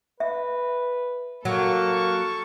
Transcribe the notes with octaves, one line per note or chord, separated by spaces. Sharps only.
B4 E5
F#3 A#3 A4 C#6